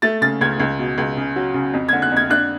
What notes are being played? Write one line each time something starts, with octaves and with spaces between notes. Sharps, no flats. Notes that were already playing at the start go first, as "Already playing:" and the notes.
A3 A6
C#3 A6
C#2 G#6
C#2
B2
C#2
C#3
F#3
C#3
F2
G#6
D3
F#6
F2
G#6
D4 F#6